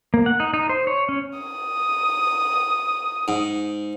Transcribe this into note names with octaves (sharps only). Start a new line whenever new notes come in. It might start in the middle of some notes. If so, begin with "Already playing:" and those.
A#3
F#5
D#4
D#4
C5
C#5
C#4
D#6
G#2